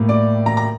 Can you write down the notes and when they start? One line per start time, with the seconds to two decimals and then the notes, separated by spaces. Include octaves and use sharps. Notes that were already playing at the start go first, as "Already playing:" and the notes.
Already playing: A2 G3 A#3
0.09 D5
0.46 A#5
0.57 A#5